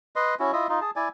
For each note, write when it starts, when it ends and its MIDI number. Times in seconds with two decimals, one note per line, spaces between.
0.16 0.35 71
0.16 0.35 75
0.16 0.35 84
0.39 0.52 61
0.39 0.52 64
0.39 0.52 66
0.53 0.67 64
0.53 0.67 65
0.53 0.67 75
0.53 0.67 76
0.69 0.80 63
0.69 0.80 65
0.81 0.91 68
0.81 0.91 81
0.96 1.09 64
0.96 1.09 74
0.96 1.09 80